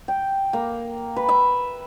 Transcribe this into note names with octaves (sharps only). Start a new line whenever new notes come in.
G5
A#3
B4
E5